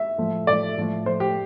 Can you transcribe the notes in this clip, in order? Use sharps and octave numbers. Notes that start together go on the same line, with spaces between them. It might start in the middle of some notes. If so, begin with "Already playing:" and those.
Already playing: E5
A2 F3 A3
A2 F3 A3 D5
A2 F3 A3
A2 F3 A3 C5
G4